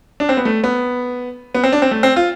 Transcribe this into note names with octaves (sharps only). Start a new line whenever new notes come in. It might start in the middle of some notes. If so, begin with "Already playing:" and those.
D4
C4
B3
A3
B3
B3
C4
D4
C4
A3
C4
F4